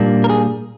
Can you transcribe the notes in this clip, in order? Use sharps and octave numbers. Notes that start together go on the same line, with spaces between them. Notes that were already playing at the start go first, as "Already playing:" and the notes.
Already playing: A#2 G3 A#3 D4
A#4
G#4